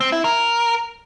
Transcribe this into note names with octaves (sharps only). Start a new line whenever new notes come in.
C4
E4
A#4